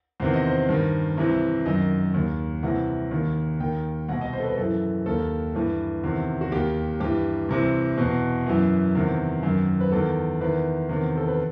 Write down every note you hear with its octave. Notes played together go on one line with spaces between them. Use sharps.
E2 C3 D#3 C5
D#5
C5
G2 D#3
C2 C3 E3
F#2 D#3 D#5
D#2 D#3
C2 C3 E3 F#5
D#2 D#3
D#2 D#3 G5
C2 B2 F#5
D#5
C5
A4
B4
F#2 E3 A4
D#2 D#3 A4
G2 E3
E2 C3 D#3
F#4
D#2 D#3 G4
G2 E3 G4
C2 C3 E3
E2 B2
F#2 E3
E2 C3 D#3
F#2 D#3
B4
E2 D#3 A4
E2 D#3 B4
E2 C3 D#3
A4
B4